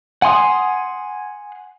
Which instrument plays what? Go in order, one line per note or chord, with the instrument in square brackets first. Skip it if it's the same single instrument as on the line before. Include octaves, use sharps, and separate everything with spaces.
[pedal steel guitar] F#5 G#5 C6 D#6